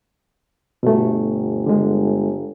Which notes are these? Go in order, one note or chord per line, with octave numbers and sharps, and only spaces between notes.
G1 B2 A3
D3 G#3